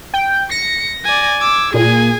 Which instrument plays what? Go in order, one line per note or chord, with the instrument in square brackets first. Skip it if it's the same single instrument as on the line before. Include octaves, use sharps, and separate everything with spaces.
[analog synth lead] G5
[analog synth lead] A#6 [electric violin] C#7
[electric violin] D5 G#5
[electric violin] D6 E6 [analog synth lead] G#6
[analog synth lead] A#2 [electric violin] G#4 G#5